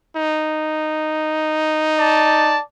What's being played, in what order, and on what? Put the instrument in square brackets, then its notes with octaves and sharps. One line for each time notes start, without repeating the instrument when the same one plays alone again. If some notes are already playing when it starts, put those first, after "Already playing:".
[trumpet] D#4
[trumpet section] D5 A5